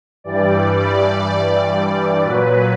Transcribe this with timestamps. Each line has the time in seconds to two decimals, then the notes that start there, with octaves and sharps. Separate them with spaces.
0.24 G2 E3 G3 D5
0.73 D5
2.23 A#2 F#3 B4